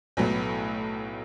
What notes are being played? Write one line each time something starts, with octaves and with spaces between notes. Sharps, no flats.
B1 A2 F#3 B3